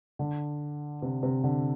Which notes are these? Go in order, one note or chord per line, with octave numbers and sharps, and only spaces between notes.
D3
C3
C3
D3